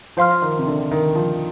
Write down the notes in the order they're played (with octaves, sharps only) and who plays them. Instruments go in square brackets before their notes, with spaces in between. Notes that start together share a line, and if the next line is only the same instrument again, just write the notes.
[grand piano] F3 [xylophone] C5 F5 C6 F6
[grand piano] D#3
C3
D3
D#3
F3